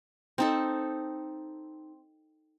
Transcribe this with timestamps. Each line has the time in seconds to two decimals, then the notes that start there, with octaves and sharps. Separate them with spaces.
0.38 C4 D#4 A4